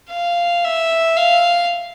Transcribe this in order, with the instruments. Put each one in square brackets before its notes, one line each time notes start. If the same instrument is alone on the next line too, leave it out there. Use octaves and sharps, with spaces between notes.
[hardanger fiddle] F5
E5
F5